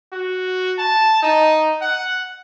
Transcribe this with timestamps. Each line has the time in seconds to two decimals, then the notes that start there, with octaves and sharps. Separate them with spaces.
0.13 F#4
0.79 A5
1.22 D#4
1.82 F#5